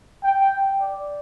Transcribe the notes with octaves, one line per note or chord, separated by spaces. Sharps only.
G5
D5